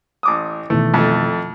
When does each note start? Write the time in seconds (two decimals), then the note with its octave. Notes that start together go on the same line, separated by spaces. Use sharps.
0.23 A1 D6 D#6
0.70 B2 D#3 E3 A3
0.94 F2 A3